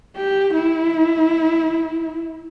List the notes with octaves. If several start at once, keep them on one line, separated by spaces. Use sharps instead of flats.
G4
E4